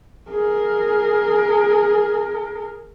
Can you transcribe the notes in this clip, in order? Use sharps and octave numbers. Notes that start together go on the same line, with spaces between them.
G#4 A#4